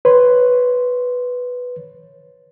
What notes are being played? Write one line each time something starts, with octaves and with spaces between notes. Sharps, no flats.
B4 C#5 C6